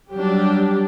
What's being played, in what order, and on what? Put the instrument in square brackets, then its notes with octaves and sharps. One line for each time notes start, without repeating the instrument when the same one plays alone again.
[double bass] F#3 G3 [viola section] D4 G4